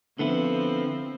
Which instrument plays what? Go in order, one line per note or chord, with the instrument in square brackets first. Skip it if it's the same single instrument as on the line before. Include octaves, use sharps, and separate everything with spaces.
[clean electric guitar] D3 B3 E4 [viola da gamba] F3 C4